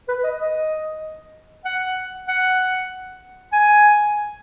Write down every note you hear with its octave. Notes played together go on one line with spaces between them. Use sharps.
B4
D#5
D#5
F#5
F#5
G#5